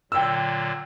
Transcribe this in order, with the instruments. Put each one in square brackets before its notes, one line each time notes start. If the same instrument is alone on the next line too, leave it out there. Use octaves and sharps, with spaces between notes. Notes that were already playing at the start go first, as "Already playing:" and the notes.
[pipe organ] A#2 D3 F#3 [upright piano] G5 E6